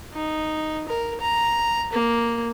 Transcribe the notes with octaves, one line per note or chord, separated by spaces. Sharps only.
D#4
A#4
A#5
A#3